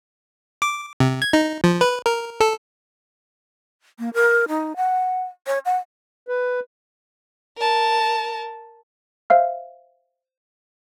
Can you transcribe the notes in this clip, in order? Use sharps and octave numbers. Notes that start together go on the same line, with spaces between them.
D6
C3
G#6
D#4
F3
B4
A#4
A4
A#3
A#4
D#4
F#5
C#5
F#5
B4
A#4 A5
C5 E5 F5 F6